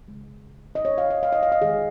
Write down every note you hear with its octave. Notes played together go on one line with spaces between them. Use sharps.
C#3 G#3
D#5
C#5
F5
D#5
F5
D#5
F5
D#5
D#3 G#3 G#4